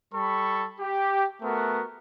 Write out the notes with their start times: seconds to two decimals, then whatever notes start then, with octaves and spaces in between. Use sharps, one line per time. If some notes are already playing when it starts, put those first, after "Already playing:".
0.14 G3 A4 B5 C#6
0.80 G4
1.42 A3 B3 F#4 A#4